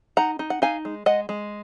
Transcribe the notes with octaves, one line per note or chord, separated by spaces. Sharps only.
D#4 F#5 A#5
D#4
F#5
D#4 F5 G#5
G#3
G#3 D#5 F#5
G#3